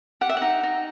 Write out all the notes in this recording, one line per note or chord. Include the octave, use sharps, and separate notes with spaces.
G4 F#5
E5
D#4 F#5
D#4